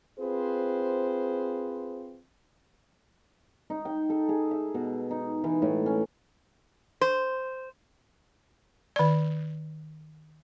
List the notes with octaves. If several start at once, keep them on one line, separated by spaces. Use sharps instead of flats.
C4 F4 G#4 B4 C5
D#4
G5
A4
G#4
E5
B2
D#4
E3
A2
C#4
C5
D#3 D5